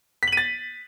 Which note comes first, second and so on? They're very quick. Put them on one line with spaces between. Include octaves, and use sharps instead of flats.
B6 F#7 D#7 A6